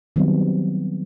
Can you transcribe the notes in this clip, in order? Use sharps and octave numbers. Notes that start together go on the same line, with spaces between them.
D#3 F#3 G3 B3 C4